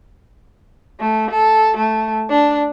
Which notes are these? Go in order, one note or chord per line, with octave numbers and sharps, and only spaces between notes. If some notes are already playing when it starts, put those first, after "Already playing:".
A3
A4
A3
D4